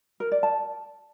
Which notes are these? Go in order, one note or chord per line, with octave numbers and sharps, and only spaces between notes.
A#4
D5
A5